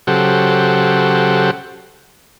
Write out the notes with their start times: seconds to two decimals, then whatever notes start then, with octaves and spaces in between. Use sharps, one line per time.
0.07 C#3 F#3 G4 A4 C5 F#5